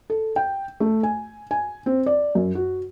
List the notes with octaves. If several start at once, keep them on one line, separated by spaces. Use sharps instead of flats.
A4
G5
A3
G#5
G#5
C4
D5
F#2
F#4